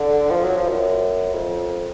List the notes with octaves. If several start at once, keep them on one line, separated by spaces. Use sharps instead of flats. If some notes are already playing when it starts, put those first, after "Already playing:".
Already playing: D3
F3
F#3
F3
F#2
F2